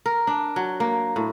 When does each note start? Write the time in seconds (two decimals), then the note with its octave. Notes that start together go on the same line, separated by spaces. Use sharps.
0.06 A#4
0.27 D4
0.56 F#3
0.80 A#3
1.16 A2